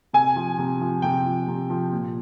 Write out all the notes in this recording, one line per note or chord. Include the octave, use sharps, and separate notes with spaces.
C3 G#5
F3
C3
F3
C3 G5
F3
C3
F3
A#2